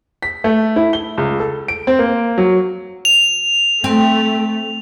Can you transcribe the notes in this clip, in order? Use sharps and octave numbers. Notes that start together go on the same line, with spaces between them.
B6
A3
E4
G7
C#2
A4
D7
C4
A#3
F#3
F7
A3 C4